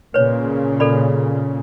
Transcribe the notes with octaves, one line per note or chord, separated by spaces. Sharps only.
A#2 C#3 B4 C#5
A4 D5 B5